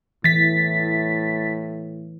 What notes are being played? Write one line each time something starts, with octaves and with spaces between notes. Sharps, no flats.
A2 E3 A6 B6